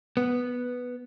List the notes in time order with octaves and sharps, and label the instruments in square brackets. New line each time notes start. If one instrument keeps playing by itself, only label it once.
[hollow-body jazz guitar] B3